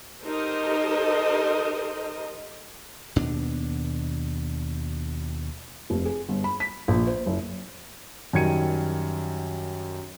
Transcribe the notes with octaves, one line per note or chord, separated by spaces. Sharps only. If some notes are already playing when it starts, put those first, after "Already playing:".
D#4 G4 A4 A#4 C5 D#5
D#2 B2 D4
F1
G#4
G1
B5
B6
A#1
C5
F#1
F#2 D#3 G3 G#6 C#7 D#7